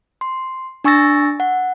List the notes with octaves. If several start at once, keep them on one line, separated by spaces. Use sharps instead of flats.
C6
D4 G#5 C#6 E6 A6 A#6
F#5